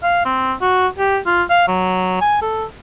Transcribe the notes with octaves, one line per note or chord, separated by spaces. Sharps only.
F5
C4
F#4
G4
F4
F5
F#3
G#5
A4